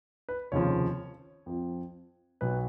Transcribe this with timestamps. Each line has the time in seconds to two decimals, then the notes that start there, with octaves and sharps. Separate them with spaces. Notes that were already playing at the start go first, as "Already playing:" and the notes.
0.29 B4
0.52 F1 D#2 C#3 F3 C#5
1.46 F2 F3
2.41 B1 B2 F#3 B4